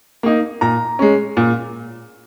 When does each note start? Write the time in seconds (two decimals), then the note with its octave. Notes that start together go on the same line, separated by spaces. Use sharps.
0.23 A#3 D#4
0.61 A#2 A#5
0.99 G#3 C#4
1.37 A#2